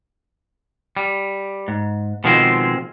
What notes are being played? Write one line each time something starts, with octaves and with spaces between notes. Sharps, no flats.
G3
G#2
B2 D#3 F3 G#3 C4